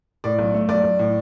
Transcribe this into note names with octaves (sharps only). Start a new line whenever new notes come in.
A2 D5
B1
A3
B1 D5
B1
A2